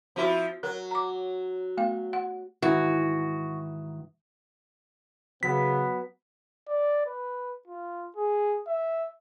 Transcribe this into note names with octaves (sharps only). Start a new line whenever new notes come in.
F3 C4 E4 F#4
F#3 A#4
A#5 D6
A3 B3 F5
F#5
G#2 D#3 E3 F#4
C#3 F#3 B3 B6
D5
B4
F4
G#4
E5